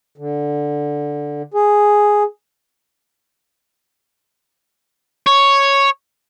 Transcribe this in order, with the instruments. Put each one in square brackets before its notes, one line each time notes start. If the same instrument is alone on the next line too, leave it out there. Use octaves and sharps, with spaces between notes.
[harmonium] D3
G#4
[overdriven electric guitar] C#5